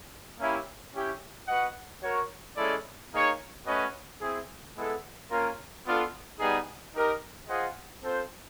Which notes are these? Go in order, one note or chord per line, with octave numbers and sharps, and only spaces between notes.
A#3 C#4 E4 G4
C#4 E4 G4
F#4 B4 D#5 F#5
F#4 A#4 C#5
G#3 C#4 E4 A4 D5
A#3 D#4 G#4 C#5
A3 C#4 F#4 B4 D#5
C4 E4 G#4
G#3 B3 E4 A4
A#3 C#4 F4 A#4
B3 D4 F4 A4
G3 B3 D#4 G#4
D#4 G4 A#4 D#5
F4 G#4 C5 D#5 F#5
C4 F4 A4 C5